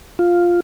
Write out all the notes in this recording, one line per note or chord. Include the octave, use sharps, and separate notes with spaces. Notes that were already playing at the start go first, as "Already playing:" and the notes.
F4